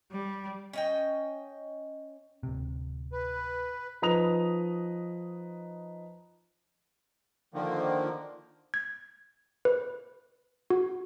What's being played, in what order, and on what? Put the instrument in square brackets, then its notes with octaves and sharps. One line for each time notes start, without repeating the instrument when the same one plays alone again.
[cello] G3
[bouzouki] C#4 D#5 G5
[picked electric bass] D1 C3
[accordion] B4
[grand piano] F3 D#4 B4 A#5 D#6 F7
[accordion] D3 D#3 F3 A#3
[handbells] G#6
B4
F#4